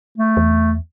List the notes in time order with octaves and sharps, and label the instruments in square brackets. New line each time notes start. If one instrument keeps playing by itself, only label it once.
[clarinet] A3
[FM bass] E2